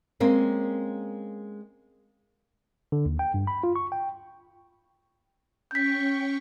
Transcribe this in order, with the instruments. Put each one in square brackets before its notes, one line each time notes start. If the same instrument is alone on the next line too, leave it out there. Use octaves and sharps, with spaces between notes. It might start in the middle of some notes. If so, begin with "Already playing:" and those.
[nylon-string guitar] G#3 A#3 C4 C#4
[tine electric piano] D3
D#2
G5
G2
B5
F4
C#6
G5
[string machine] C#4 G5 C#6 [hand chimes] G6 B6